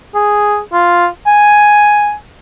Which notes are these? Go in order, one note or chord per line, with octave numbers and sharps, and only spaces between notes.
G#4
F4
G#5